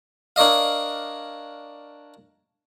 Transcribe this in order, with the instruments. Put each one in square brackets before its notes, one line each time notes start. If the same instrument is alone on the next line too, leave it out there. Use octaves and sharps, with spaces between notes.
[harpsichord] D4 A#4 C#5 D#5 F5